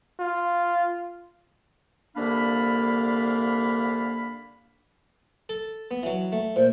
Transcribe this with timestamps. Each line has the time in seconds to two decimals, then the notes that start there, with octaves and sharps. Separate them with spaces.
0.20 F4
2.17 C2 D3 A#3 D4 F5 B5
5.49 A4
5.91 B3
6.03 E3 F#3
6.32 A3
6.56 A#2 C5